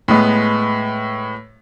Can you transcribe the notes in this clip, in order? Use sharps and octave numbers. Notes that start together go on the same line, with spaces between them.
A2 G#3 B3